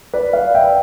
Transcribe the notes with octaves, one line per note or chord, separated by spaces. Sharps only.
B4 D5
D5 F5
E5 G5